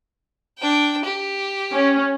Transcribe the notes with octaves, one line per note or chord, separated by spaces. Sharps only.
D4 G5
G4
C#4